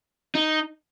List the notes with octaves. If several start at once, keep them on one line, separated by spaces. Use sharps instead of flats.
D#4